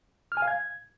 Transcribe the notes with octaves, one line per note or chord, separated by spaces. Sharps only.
F6
G#5
F5
G#6